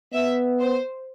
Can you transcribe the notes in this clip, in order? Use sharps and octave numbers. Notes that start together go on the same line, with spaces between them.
B3 E5
C5